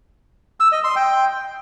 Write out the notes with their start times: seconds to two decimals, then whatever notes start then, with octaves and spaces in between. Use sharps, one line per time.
0.60 E6
0.72 D#5
0.84 C6
0.96 G5